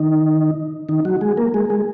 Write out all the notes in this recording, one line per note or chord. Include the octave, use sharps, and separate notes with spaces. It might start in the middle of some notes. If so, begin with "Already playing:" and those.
Already playing: D#3 D#4
D#3 D#4
F#3 F#4
G#3 G#4
A#3 A#4
G#3 G#4
G#3 G#4